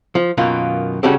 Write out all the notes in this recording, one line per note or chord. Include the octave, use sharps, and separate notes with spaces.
F3
F#2 B2 D#3 A#3 F4
C#3 G3 C#4 F#4 G4 A4